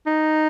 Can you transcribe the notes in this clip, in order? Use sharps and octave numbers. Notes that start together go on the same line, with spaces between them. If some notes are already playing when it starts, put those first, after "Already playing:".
D#4